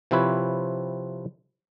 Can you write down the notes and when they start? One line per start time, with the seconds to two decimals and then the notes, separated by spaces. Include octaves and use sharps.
0.11 C3 F3 C4 E4 B4 C#5